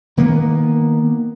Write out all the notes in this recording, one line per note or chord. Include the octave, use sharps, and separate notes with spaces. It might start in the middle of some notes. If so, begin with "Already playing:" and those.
D#3 A#3 B3